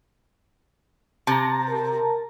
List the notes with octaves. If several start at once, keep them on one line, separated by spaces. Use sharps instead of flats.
C3 A5 A#5
A#4